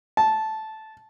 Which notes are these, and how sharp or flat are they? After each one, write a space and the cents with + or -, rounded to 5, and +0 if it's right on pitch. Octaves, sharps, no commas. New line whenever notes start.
A5 -10